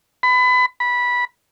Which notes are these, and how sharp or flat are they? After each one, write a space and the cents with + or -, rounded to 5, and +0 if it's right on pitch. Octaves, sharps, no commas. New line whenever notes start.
B5 +25
B5 -15